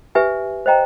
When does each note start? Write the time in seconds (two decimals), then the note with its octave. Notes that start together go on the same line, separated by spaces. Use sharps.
0.15 G4 B4 E5 G#5
0.66 C5 D#5 G5 A#5